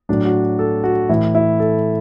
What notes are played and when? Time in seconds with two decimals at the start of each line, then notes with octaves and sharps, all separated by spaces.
0.09 A2 F#3 D4
0.25 F#4
0.59 A4
0.84 F#4
1.09 A2 E3 E4
1.35 E4
1.60 A4